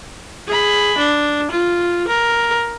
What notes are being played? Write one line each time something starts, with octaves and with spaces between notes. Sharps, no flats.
G#4 B5
D4
F4
A#4